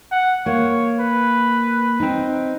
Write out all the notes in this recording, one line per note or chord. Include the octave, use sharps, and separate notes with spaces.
F#5
A#3 C#5
B4
C4 D#4